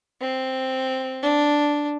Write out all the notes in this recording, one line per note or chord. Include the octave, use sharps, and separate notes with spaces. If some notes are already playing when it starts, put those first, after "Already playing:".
C4
D4